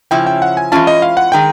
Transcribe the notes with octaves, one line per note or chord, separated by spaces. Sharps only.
C#3 F3 C#4 E4 G5
G5
F#5
G#5
E3 G#3 C#4 F4 A5
D#5
F5
F#5
D#3 G#3 G5